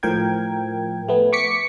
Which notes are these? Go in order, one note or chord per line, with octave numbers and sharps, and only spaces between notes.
A2 F3 A#4 G5 G#6
A3 B3
C#6 D6 B6 C#7